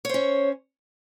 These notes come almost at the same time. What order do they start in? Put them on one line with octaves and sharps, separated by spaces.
C#5 C5 C#4